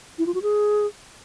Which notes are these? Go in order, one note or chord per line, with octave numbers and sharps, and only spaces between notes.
E4
F4
F#4
G#4